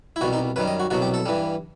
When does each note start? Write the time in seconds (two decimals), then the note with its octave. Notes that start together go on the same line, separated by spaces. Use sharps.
0.16 E4
0.21 C2 B2 G3 F#4
0.33 D#4
0.56 F#2 D#3 G3 B4
0.68 D#5
0.80 F#4
0.91 C2 B2 F#3 F#4
1.02 G4
1.14 A4
1.26 G2 E3 G3